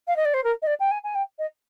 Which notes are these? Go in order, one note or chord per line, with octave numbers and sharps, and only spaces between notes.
F5
D#5
D5
C5
A#4
D#5
D5
G5
G#5
G#5
G5
D#5